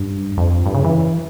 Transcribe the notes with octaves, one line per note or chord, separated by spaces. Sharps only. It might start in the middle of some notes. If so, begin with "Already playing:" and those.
Already playing: G2
F2
G2
C#3
E3